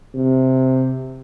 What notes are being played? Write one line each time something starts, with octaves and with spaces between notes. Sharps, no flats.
C3